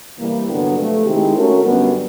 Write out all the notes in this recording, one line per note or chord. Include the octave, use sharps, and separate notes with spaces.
C3 E3 G3 A#3
G2 D3 F#3 B3
C3 F3 A3
D#3 G#3 C4 E4 G4
A3 C#4 F#4 A#4
F#2 D3 G3 B3